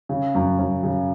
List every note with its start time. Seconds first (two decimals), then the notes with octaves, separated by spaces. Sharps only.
0.09 C#3
0.35 F#2
0.59 F#2
0.83 C#3